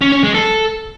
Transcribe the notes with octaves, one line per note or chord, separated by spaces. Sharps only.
C#4
C#4
G#3
A4